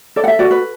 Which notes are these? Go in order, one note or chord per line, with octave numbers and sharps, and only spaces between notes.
A4 D5
F#5
E5
F#4 D5
B4